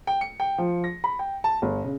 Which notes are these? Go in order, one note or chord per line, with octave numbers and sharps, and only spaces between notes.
G5
C#7
G5
F3
A#6
B5
G5
A5
G1
C#3